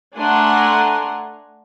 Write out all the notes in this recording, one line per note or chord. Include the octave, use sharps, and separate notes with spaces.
A3 D4 F#5 G#5 A#5 C6